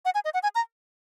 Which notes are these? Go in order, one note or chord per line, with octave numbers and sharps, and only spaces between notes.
F#5
G#5
D#5
F#5
G#5
A#5